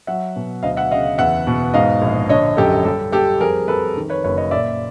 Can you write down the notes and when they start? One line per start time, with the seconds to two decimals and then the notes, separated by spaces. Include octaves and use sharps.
0.07 F#3 E5 F#5
0.36 B2
0.63 D2 D#5 F5
0.77 E5 F#5
0.91 C#3 D#5 F5
1.18 E2 E5 F#5
1.47 B2
1.74 G#2 D#5 F5
2.02 A#1
2.29 D3 C#5 D#5
2.57 F#2 G4 A4
2.85 G3 G4 A4
3.12 G3 G4 A4
3.41 F2 G#4 A#4
3.68 F2 A4 B4
3.97 D#3
4.10 B4 C#5
4.24 F#1 B4 C#5
4.37 C#5 D#5
4.51 A#2 D5 E5